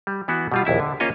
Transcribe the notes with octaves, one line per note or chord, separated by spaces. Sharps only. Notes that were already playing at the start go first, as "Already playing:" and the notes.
G3
E3 B3 E4 F#4
B2 G3 F4
A#1 D#2 E4 E5
D3
A#3 C#4 F4 C#5 D#5 G#5